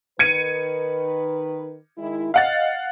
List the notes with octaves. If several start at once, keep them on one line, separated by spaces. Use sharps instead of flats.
D#3 B4 G#6 C#7 D#7
D#3 G#3 E4
D#5 F5 F#5 A6